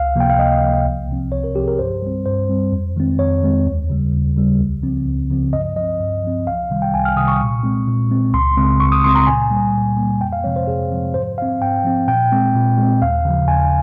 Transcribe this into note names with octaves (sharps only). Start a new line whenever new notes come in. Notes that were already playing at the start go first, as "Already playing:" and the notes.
Already playing: C#2 F5
C3 F3 A#3 G5
F5
C#2 D#5
C3 F3 A#3
C2
C3 F3 C4
C2 C#5
A#4
C3 F3 C4 G4
G#4
A#4
G2 C5
G3 C4
G2 C5
G3 C4
F2
D#3 G#3 C4
F2 C#5
D#3 G#3 C4
D#2
C#3 G3
D#2
C#3 G3
C#2
C#3 F3 C4
C#2
C#3 F3 C4
G2 D#5
F3 C4 D#5
G2
F3 C4
C2 F5
C3 D#3 G3
G5
C2 G#5
F6
C3 D#3 G3 D#6
C#6
A#2
G#3 C4
A#2
G#3 C4
C#2 C6
C#3 G#3 C4
C#2 C#6
D#6
C#3 G#3 C4 C6
A#5
A#2 G#5
G3 A#3
A#2
G3 A#3
F2 G5
F5
C3 F3 G#3 C4 C#5
C5
F2 G#4
C3 F3 G#3 C4
G#2 C5
F3 C4 F5
G#2 G5
F3 C4
A#2 G5
G#3 C4
A#2
G#3 C4
D#2 F5
C#3 F3
D#2 G#5